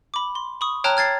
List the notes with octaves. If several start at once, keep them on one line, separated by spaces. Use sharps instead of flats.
B5 D6
C6
B5 C#6 D#6
C#5 G5 A5 A#5 F6 F#6
F6 G#6 A6 C7